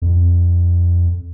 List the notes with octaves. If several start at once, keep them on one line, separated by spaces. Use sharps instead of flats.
F2